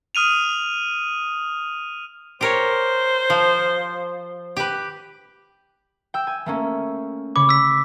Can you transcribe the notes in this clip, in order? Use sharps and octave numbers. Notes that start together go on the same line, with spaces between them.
D#6 F6 D#7 F7
G4 A#4 C5 C#5
F3
G4 B4
G5 E6
G#5
A3 A#3 C#4
C#3 C#5 B5 D6
E6 B6 D7